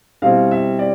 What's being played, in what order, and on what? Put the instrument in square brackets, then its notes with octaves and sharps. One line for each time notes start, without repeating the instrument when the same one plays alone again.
[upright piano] B2 G3 C4 E4 F5
E5
D5